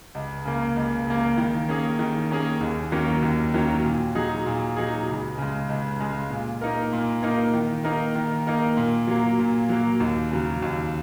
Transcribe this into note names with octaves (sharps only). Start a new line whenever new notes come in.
C#2
C#3 A#3
C#2
C#3 A#3
D#3
A#3 C#4 G#4
D#3
A#3 C#4 G#4
D#2
D#3 F#3 A#3 C#4
D#2
D#3 F#3 A#3 C#4
A#2
F#3 D#4 G#4
A#2
F#3 D#4 G#4
C#2
C#3 G#3
C#2
C#3 G#3
A#2
A#3 D#4 A#4
A#2
A#3 D#4 A#4
D#3
A#3 D#4 A#4
D#3
A#3 D#4 A#4
A#2
F#3 A#3
A#2
F#3 A#3
D#2
C#3 F#3
D#2